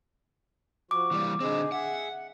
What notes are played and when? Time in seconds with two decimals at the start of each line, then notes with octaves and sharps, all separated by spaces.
0.91 F3 F#4 D6
1.12 E3 G3 A#3
1.40 D3 C4 D#4 G#4
1.72 G#4 E5 F#5